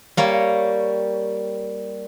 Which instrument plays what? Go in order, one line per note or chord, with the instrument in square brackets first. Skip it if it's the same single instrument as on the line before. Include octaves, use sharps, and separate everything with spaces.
[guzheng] G3 A#3 C#5